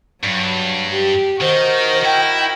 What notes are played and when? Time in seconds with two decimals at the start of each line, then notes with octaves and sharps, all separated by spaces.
0.24 G2 F#3
0.91 G4
1.41 D#3 F#4 A#4 C5 D#5
2.04 E4 G5